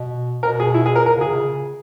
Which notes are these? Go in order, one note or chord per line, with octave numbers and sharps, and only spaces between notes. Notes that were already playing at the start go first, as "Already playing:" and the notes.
Already playing: B2
B2 A#4
G#4
E4
G#4
A#4
A#4
C#3
G#4
D#3
B2
C#3